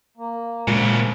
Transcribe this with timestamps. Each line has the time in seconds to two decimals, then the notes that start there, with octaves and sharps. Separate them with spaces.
0.17 A#3
0.68 D2 A#2 C#3 F3 G#3 A#4